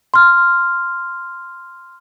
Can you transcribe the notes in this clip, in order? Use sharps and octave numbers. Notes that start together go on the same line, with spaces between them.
C6 F6